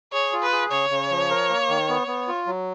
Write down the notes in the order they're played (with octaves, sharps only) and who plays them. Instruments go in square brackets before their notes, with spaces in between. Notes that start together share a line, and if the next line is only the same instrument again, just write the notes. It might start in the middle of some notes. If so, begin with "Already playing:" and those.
[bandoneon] G#4 [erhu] C#5
[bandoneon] F4
[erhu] B4
[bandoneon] G#4
[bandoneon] C#3 [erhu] C#5
[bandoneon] C#3
F3
A#4
A#3
D#3
B3
B3
F4
F#3